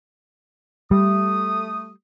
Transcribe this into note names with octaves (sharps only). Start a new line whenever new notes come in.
G3 A3 D#6